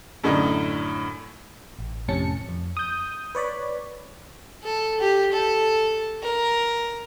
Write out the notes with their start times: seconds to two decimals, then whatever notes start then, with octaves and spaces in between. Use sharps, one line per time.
0.24 F#2 A2 D3 D#4
1.79 A1
2.08 F2 A2 C3 C#4 A5 C#7
2.49 F2
2.77 D#6 G6
3.35 B4 C#5 D5 B5
4.63 A4
5.00 G4
5.32 A4
6.23 A#4